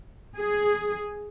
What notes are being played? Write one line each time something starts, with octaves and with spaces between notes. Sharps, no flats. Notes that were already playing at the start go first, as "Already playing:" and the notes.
G#4